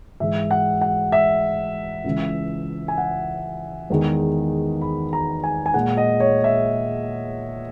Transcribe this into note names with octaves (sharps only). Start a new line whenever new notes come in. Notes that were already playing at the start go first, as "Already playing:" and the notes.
G#2 E3 G#3 E5
F#5
F#5
E5
C#2 C#3 E3
G#5
F#5
E2 D#3 G#3
B5
A#5
G#5
G#5
A#2 G#3 F#5
D#5
C#5
E5